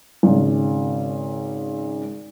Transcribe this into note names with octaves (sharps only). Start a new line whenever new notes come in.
G#1 C#3